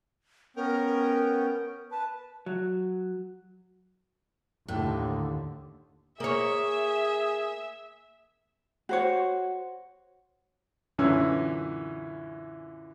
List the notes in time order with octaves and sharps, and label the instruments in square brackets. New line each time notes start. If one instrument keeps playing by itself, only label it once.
[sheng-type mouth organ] B3 C#4 G5 [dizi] A#4
[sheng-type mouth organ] B4 [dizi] A5
[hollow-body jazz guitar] F#3
[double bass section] D#2 D3 [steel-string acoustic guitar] A2
[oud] A#3 C#5 [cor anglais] G#4 [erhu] E5
[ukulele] F#4 C5 C#5
[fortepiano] F#2 A#2 D3 E3 C#4 E6